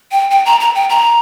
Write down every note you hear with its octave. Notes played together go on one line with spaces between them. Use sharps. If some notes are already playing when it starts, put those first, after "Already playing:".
G5
G5
A#5
A#5
G5
A#5